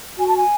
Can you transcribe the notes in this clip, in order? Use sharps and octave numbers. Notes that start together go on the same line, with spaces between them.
F#4 G#5
A5
G#5